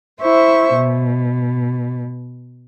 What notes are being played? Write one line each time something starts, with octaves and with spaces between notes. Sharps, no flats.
E4 C5 E5 C#6
B2